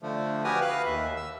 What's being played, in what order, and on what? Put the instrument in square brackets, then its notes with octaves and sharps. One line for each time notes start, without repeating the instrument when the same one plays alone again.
[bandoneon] D3 F3 A3
F#4 G4 B4 G#5 D#6 F6
B4 F5 F#6
D#2 E5
E6